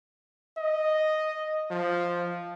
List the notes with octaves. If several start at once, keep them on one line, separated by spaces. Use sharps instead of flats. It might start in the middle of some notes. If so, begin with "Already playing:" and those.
D#5
F3